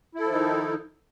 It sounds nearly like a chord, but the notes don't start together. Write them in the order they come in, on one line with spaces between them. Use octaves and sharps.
E4 A4 F3 D#3 D#4